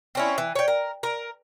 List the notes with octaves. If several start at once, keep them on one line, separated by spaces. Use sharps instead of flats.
C4 C#4 E4
E3
C#5 G5
A#4
A#4